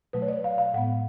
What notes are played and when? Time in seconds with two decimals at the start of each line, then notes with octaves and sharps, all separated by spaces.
0.13 B2 F#3 A3 B4
0.22 C#5
0.28 D5
0.44 F5
0.58 F5
0.73 A2 G#3 B3 F#5